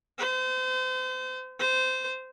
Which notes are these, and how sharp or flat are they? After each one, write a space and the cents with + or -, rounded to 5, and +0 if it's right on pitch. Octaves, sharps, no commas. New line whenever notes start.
C5 -35
C5 -20